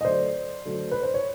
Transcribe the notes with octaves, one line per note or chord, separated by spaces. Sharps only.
D#5
D3 F#3 A3 C5 D5
D3 F#3 A3
B4
C5
C#5